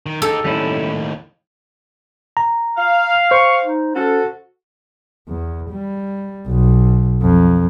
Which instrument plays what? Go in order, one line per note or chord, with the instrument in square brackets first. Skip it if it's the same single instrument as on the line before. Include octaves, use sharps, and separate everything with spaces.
[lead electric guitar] D#3
[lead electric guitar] D#4 G4 [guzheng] A4
[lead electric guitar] D#2 A2 [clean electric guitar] G3 C#4 E4
[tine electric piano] A#5
[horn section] F5 [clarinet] F6
[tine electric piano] C5 [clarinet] C#6
[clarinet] D#4
[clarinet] C#4 [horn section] F#4 A4
[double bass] E2
G3
B1
F2